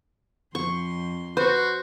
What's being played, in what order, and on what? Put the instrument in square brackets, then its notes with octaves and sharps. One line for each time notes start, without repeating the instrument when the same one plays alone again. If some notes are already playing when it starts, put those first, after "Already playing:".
[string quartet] F2 C6 [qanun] C#6
[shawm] F#4 [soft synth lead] B4 [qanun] C5